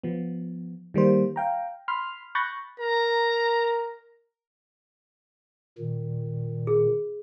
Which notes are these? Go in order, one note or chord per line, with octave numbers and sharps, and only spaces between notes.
F3 B3
D#3 G3 A#3 C5
F5 G5 A#5
B5 C6 F6
B5 C#6 F#6 G6 A6 A#6
A#4 A#5
A#2 D#3
G#4